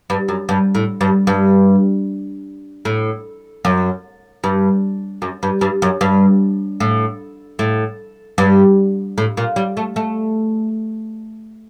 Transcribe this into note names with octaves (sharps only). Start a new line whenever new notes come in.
G2
F#2
G2
A2
G2
G2
A2
F#2
G2
F#2
G2
G2
F#2
G2
A2
A2
G2
A2
A#2
G3
A3
A3